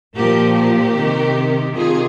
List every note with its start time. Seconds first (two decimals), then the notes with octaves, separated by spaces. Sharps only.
0.15 A#2 F3 G4 A#4
0.55 G4 A#4
0.96 C3 D#3
1.75 C3 D#3 F4 G#4